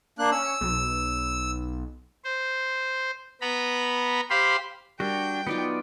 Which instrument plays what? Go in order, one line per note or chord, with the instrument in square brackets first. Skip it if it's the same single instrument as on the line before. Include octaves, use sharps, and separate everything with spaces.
[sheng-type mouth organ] A#3 D4 F#6
[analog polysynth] C#4 C#7 [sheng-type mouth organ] E6
[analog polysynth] B1
[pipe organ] C5
B3 A#5 B5
G4 C5 F5 B5 C6
[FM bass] G3 [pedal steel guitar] D4 F#4 [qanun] A#4 [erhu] G5
[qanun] F#3 D#4 F4 [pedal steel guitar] B3 D5